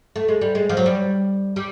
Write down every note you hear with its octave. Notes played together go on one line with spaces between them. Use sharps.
A3
G#3
G3
G#3
F3
F#3
G3
G3